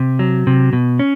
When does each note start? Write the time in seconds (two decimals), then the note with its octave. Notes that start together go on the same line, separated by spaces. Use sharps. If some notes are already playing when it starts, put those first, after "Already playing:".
Already playing: C3
0.19 F#3
0.47 C3
0.73 B2
0.99 C#4